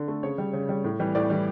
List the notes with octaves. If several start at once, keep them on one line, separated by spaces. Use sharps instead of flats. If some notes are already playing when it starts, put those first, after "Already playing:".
Already playing: D3
A3
C#3 C#5
G3
C#3
G3
A2
E3 G3
A2 D5
E3 G3